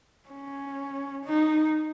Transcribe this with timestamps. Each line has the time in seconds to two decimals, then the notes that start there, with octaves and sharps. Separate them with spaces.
0.29 C#4
1.25 D#4